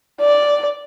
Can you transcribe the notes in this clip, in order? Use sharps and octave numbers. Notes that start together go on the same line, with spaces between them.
D5